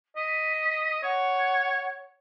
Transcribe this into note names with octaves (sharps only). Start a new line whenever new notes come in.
D#5 B6
C#5 F#5